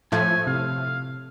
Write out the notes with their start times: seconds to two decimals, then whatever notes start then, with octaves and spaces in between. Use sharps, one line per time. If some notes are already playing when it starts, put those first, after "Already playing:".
0.12 A2 F3 A3 G#5
0.47 C3 F5